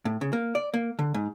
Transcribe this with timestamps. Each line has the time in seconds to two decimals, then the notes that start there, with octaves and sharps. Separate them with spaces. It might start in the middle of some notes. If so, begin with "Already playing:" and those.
0.05 A2
0.21 C#3
0.33 A#3
0.55 D5
0.74 A#3
0.99 D3
1.14 G#2